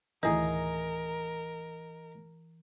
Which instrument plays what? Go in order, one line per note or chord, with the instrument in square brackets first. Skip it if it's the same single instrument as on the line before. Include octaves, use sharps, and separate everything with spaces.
[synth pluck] D2 A2 D#3 [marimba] E3 [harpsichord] D#4 G#4 [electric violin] A#4